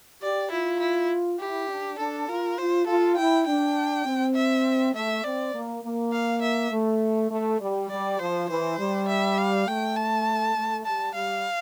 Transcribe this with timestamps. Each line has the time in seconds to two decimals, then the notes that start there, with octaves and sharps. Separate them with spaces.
0.22 G4 D5
0.51 E4 F4
0.80 E4
1.40 E4 G4
1.70 D4
1.99 D4 A4
2.28 F4 A#4
2.58 F4 C5
2.87 F4 A4
3.17 E4 G5
3.46 D4 G5
4.06 C4
4.35 E5
4.94 A3 E5
5.24 C4 D5
5.54 A#3
5.83 A#3
6.12 F5
6.42 E5
6.71 A3
7.30 A3
7.60 G3
7.90 G3 D5
8.19 F3 C5
8.49 E3 C5
8.79 G3
9.09 E5
9.38 F5
9.67 A3 G5
9.97 A5
10.56 A3
10.85 G3 A5
11.15 G3 F5